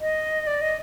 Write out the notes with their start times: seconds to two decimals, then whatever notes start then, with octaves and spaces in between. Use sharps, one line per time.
0.01 D#5
0.47 D5
0.61 D#5